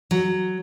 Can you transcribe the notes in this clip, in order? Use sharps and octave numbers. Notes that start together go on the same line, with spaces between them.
F#3